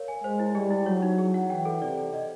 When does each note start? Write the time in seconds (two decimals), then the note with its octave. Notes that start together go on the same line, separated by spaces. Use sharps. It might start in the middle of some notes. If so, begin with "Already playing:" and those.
Already playing: A#4 C#5 F5
0.08 G#5
0.24 G#3 C5
0.39 E4
0.55 G3 G#4
0.71 E4
0.86 F#3 C#5
1.02 D#4
1.18 G#4
1.34 F#5
1.50 E3 G5
1.65 A4
1.82 C3 D5
1.98 A4
2.14 D#5